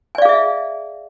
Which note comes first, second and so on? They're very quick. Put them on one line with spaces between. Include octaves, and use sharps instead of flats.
G#5 D5 F5 G#4 E5